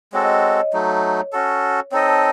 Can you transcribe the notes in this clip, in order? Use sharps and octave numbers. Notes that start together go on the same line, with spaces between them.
G#3 C4 F#4 A4 C#5
D#5
C#5
F#3 A3 D#4
C#4 F#4 A4
C4 D#4 A4 C#5 D#5
A5